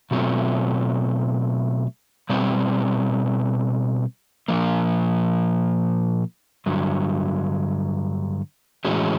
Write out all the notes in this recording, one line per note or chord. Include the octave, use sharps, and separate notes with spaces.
B2 F#3 A3 C4 F4
B2 G3 C4
A#2 F3 A#3
G2 D3 F#3
A2 E3 G#3 C#4 F#4